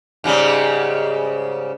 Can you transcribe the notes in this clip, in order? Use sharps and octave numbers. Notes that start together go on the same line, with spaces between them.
G#2 C#3 G3